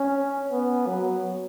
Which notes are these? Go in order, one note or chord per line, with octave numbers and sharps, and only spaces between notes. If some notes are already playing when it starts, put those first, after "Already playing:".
Already playing: C#4
B3
F#3